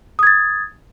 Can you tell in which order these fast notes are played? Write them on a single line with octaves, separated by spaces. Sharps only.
D#6 G#6 A6